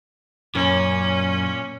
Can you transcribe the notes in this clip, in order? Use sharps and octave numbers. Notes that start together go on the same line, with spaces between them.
F#2 A#2 C#4